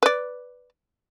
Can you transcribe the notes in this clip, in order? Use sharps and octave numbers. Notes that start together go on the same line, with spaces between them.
B4 D5